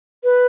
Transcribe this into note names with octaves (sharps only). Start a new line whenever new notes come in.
B4